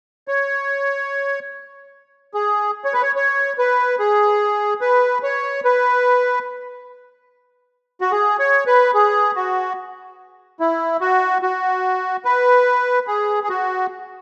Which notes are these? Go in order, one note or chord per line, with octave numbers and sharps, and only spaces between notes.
C#5
G#4
C#5
B4
C#5
C#5
B4
G#4
B4
C#5
B4
F#4
G#4
C#5
B4
G#4
F#4
E4
F#4
F#4
B4
G#4
G#4
F#4